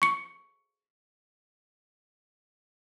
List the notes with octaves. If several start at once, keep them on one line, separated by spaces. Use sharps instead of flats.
C#6 C#7